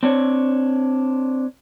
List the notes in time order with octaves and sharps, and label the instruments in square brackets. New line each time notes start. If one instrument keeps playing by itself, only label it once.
[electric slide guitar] C4 D4 C#5